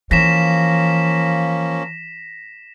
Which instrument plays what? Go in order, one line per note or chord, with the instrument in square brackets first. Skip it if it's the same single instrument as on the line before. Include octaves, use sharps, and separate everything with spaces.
[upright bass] E3 [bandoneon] F3 A#3 C#4 [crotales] A#6 B6 E7